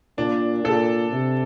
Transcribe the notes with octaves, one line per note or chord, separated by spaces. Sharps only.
A#2 D4
A#2 A4
C3